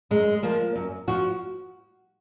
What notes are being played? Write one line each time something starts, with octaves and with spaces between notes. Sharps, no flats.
F#2 G#3
F3 A#3
F#2
F3 F#4